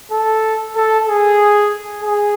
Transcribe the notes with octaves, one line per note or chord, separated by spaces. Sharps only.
A4
A4
G#4
G#4